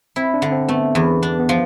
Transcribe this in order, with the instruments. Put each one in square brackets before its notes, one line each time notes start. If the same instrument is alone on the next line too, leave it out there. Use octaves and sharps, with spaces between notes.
[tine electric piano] C4 [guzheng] E4
[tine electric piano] D4
[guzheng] D3
[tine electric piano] C4
[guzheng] A3 [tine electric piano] B3
[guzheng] E2
[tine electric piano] B3 [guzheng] D4
[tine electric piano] B3
[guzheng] F3